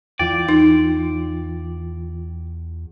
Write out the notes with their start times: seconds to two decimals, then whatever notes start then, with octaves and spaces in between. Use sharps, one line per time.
0.19 E2 E3 F4 D5 G5
0.49 D#4